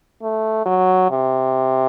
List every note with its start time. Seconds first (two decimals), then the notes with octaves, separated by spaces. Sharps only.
0.22 A3
0.66 F#3
1.10 C3